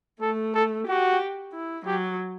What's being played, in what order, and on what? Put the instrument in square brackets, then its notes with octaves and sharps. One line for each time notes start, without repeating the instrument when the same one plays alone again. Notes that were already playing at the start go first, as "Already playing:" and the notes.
[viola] A3 [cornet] A4
[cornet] A4
[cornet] F#4 [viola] G4
[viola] E4
[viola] F#3 [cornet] G4